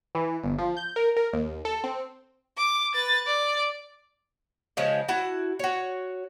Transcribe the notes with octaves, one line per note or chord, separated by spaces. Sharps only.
E3
G1
F3
G6
A#4
A#4
D#2
A4
C4
D6
B4 A6
D5
C#3 F3 G#3
E4 F#4 A5
F#4 C#5